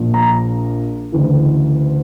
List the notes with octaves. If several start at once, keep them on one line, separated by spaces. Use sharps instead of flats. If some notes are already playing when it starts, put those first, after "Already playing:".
Already playing: A#1 A#2
A#5
D2 C#3 E3